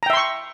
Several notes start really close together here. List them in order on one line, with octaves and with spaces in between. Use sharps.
A#5 G5 E5 C6 C#6